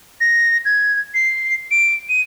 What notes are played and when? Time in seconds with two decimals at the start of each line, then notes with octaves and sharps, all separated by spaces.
0.21 A#6
0.65 G#6
1.14 C7
1.71 D7
2.09 D#7